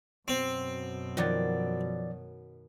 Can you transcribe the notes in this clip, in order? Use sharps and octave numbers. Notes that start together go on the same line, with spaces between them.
F#2 B2 C4
D#3 F3 F#3 D5 A6